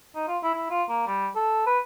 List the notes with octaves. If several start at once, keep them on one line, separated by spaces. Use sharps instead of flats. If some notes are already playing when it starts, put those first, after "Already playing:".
D#4
F4
E4
E4
F4
A#3
G3
A4
B4